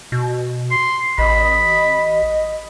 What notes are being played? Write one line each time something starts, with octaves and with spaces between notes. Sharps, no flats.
B2
C6
A1 D#5 B5